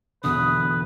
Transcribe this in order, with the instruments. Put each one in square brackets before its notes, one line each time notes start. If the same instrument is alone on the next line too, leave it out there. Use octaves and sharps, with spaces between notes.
[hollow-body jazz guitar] E2 B2 D3 [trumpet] B4 [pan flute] D#6